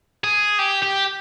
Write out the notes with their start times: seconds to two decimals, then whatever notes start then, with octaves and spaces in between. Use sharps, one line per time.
0.24 G#4
0.59 G4
0.83 G4